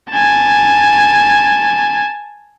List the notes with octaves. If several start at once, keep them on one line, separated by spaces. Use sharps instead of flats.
G#5 A5